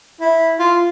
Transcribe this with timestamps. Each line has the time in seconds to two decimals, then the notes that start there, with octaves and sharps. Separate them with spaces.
0.21 E4
0.60 F4